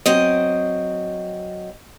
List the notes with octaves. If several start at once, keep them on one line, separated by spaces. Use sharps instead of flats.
F#3 C4 D#5